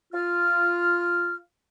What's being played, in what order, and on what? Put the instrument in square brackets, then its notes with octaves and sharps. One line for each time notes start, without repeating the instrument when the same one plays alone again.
[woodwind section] F4 F6